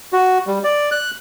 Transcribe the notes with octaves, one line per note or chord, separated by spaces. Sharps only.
F#4
G3
D5
F#6